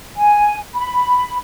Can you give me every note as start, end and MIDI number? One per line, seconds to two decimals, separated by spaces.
0.17 0.57 80
0.75 1.37 83